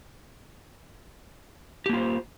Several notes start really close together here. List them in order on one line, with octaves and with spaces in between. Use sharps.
G4 A#3 F4 C5